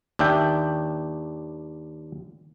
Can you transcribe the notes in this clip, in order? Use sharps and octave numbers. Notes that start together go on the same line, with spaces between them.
D#2 D4 E5 G5